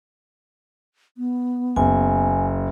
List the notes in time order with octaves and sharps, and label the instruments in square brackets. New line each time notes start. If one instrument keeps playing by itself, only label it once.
[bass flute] B3
[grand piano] F#1 [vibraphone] G#5